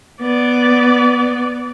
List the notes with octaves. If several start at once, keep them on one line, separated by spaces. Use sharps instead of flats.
B3 D5